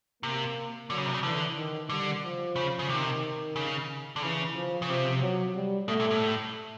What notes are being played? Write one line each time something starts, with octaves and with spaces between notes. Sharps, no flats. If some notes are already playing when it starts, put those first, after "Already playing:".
C3 A#3
D3 F#3
C#3
C3
C#3
D3 E3
D#3
D3 G3
F3
C#3
C#3
C3 D#3
C#3
D3
C#3 E3
F3
C#3
C3 F3
F#3
G3
B2 A3
A#2
A2